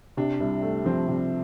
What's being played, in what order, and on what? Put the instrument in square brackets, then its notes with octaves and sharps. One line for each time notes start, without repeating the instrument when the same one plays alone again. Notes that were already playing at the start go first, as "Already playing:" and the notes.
[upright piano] C3 [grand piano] D4
[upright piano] C2
A3
[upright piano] F3 [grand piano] C4
[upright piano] C3